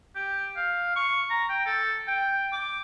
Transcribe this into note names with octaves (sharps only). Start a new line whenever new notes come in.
G4
F5
C#6
A#5
G5
A4
G5
D6